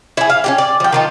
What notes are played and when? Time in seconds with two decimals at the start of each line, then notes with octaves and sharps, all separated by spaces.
0.17 E4 G#4
0.30 F5
0.44 C#4 F4 G4
0.58 D5
0.80 F3 G5
0.93 D#3 F3 D#4